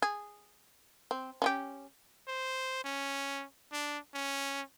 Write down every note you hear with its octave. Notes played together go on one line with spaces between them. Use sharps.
G#4
C4
C#4 F4 G4
C5
C#4
D4
C#4